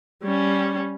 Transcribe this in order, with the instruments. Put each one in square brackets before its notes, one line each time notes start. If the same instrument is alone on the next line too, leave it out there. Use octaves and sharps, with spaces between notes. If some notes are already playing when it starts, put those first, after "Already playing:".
[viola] G3 C#4